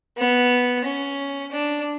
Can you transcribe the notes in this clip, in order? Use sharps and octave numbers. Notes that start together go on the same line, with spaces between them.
B3
C#4
D4